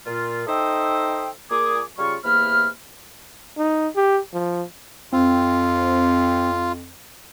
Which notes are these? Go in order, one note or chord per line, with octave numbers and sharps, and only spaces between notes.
A#2 F4
D#4 A4 C5 D#5 E5 G5
A#2 G#4 D6
C#3 G3 F4 F5 C#6
E2 C3 A#3 B5 F6
D#4
G4
F3
F2 C4 F4